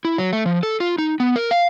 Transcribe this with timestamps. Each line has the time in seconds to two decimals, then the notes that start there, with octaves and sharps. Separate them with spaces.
0.05 E4
0.18 F#3
0.33 A3
0.46 F3
0.63 A4
0.80 F4
0.98 D#4
1.20 B3
1.36 A#4
1.51 F5